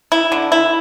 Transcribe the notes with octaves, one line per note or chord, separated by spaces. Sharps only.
E4
D3
E4